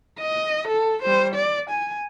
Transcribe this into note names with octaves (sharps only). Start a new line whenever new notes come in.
D#5
A4
G3 C5
D5
G#5